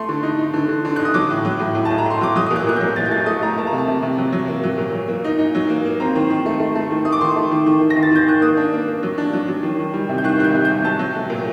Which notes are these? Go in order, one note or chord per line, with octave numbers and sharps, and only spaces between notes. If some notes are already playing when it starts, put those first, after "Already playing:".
Already playing: A3 C6
D3
D#4
D#4
D3
D3
D3
D#4 F#6
D#6
F#3 D6
A2
F#3
A2
A2
A5
A2
A#5
A2 C6
F#3 D6
F#3 D#6
A#2 D#6
F#6
A#2 F#6
F#3 G6
A#2 A6
G6
A3 A6
A3 D#6
A3 A#5
A#3 A5
A#5
C3
A5
C3
C3
F#3
F#3
A#3
F#3
A#2
F#3
A#3
D#4
D#4
F#3
A#3
A#3
C4 A#5
D#3
D#3
A3
A3
A3
D#3
A3 D#6
D6
D#3 C6
A3
D#3
D#3
D#3
A#6
D#3
A6
D#3 G6
D#3 F#6
A#3 D#6
D4
A#3
A#3
F#3
D4
F#3
F#3
D#3
D#3
G3
C3
G6
D#3 F#6
G3 F#6
G6
C3
C3 G6
F#3 A5
F#3
A3
A#2